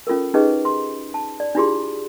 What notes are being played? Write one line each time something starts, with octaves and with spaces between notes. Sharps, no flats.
C#4 F4 A4 A#4
C#4 D#4 G4 G#4 B4 D#5
C6
A5
D5
D4 E4 F4 G4 G#4 C6